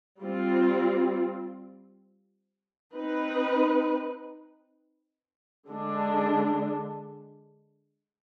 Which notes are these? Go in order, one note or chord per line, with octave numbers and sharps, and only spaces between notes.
G3 C4 F4
C4 D#4 B4
D3 G#3 D4